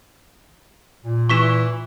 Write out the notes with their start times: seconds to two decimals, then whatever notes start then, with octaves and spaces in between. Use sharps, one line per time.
1.05 A#2
1.29 E3 C#6 B6 E7